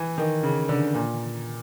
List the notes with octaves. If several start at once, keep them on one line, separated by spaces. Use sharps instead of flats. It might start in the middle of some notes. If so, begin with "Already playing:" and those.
Already playing: E3
D#3
C#3
D3
A#2